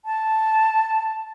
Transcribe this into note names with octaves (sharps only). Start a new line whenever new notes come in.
A5